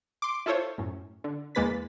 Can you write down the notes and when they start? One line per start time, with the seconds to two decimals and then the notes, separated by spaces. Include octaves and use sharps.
0.22 C6 D6
0.46 E4 F4 A4 C5 C#5
0.78 F#2 A2
1.24 D3
1.55 E2 G#3 A#3 B4 A6 B6